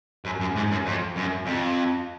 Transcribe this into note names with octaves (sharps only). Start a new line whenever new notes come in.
F#2
F#2
G#2
F#2
F2
F#2
F2